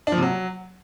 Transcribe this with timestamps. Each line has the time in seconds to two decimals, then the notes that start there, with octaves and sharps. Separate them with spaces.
0.07 D4
0.12 F3
0.17 C3
0.22 F#3